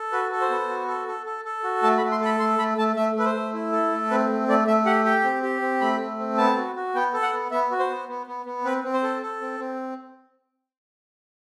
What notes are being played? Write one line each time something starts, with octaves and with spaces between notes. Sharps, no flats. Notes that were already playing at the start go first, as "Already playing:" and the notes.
Already playing: A4
F#4 B4
A4
C5
B3
F#4
A4
A4
A4
A4
F#4
A3 A5
B5
A3
C6
A4 B5
A3 C6
A3 B5
A3 A5
A3 E5
A3 B4
C5
A3
E4
A4
A3
C4 B4
A3
A3 D5
A3 E5
G4 F#5
G4 G5
C4
G4
C4
A3 B5
A3
C4
B3 A5
F#4
F#4
B3 G5
A4
F#5
B3
B3 E5
F#4
C5
B3
B3
B3
B3
C4 B4
C4
C5
A4
A4
C4
C4